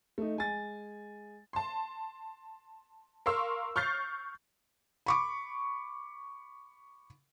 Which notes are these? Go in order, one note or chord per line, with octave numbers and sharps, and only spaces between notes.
A3 D#4
G#3 G#5 A6
A5 C6
A#4 F5 C6 C#6 E6
C#6 F6 G6 A6 C7
B5 C#6 D6